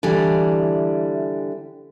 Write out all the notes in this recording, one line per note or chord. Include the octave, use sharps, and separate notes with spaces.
D3 E3 G3